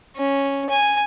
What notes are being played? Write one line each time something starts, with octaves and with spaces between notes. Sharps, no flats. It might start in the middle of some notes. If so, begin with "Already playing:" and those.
C#4
G#5